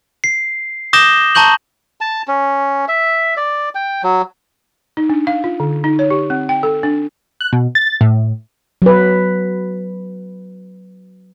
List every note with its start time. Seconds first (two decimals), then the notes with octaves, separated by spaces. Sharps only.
0.24 C7
0.93 D6 D#6 G6 A#6 E7 G7
1.35 A5 A#5 C#6 G6 F#7
2.01 A5
2.28 C#4
2.88 E5
3.37 D5
3.75 G5
4.03 F#3
4.97 D#4
5.09 D4
5.27 F5
5.44 F4
5.60 D3
5.84 D#4
5.99 C#5
6.10 G4
6.30 C4
6.49 G5
6.63 A4
6.83 D4
7.41 F#6
7.53 B2
7.75 A6
8.01 A2
8.82 F#3 B4